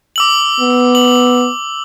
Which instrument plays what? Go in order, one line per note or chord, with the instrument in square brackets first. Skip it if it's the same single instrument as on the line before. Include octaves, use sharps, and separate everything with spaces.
[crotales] D6 E6 F#7
[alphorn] B3
[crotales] F#7